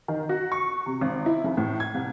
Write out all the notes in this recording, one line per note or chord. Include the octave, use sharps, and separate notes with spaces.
D#3
F#4
C#6
C3
G#1
E4
F1
A2
G#6
C2